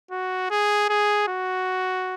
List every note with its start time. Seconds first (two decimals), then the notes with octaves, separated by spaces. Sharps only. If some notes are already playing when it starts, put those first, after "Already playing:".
0.11 F#4
0.51 G#4
0.90 G#4
1.28 F#4